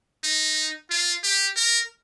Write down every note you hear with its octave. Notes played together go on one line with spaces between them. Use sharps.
D#4
F4
G4
A#4